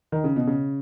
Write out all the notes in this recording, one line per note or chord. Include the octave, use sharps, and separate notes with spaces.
D#3
C#3
B2
C#3